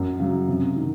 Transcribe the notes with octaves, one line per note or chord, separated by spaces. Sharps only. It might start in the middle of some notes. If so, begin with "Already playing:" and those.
Already playing: F#2
C#3 F#3
C3
D#3